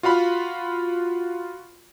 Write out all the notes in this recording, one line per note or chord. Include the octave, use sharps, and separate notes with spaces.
F4 F#4 F5 B5